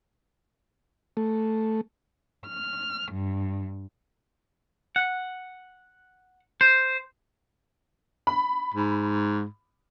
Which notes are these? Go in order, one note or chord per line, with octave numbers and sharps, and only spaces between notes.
A3
F6
G2
F#5
C5
B5
G#2